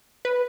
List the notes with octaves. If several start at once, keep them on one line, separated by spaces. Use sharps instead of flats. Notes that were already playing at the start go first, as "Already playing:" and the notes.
B4